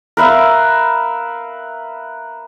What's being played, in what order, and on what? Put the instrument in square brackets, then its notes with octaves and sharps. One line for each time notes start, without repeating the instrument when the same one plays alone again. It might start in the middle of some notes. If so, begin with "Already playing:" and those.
[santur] A#4 B4 E5 F5